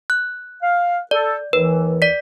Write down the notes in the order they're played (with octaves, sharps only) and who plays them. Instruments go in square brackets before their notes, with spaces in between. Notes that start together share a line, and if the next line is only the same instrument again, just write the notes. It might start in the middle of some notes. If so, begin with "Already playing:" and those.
[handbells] F#6
[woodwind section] F5
[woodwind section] A4 [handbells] D5
[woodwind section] D#2 E3 [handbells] B4
[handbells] D5 B6